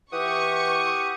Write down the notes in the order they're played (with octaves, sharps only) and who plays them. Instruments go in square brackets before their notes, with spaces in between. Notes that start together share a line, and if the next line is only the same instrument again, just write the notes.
[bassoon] E3 [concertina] G4 F#5 D#6 [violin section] C#6